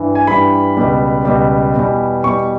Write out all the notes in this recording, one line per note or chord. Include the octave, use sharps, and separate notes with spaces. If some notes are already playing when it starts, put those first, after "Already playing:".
Already playing: G2 E3
G#5
G2 E3 G3 B5
C#2 B2 G3
C#2 B2 G3
E2 B2 G3
E2 B2 G3 C#6